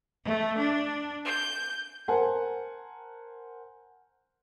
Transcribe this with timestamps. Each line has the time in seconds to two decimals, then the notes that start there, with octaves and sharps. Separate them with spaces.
0.24 A3
0.57 D4
1.27 G6
2.08 A#4 C5 F#5 G#5 A5